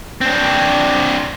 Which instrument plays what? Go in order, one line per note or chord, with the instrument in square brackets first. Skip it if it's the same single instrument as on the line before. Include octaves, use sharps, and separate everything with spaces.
[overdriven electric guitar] C4 D4